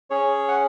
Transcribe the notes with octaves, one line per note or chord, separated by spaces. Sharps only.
C#4 G#4 C#5
F#5